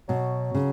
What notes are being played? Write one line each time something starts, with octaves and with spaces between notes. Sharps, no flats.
B2 F#3
C#3